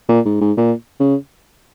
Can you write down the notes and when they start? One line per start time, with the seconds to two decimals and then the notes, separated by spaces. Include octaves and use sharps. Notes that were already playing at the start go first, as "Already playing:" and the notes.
0.09 A#2
0.25 G#2
0.41 G#2
0.57 A#2
1.00 C#3